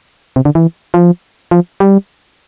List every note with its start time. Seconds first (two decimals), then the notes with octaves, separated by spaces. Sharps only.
0.36 C3
0.45 D3
0.55 E3
0.94 F3
1.51 F3
1.80 G3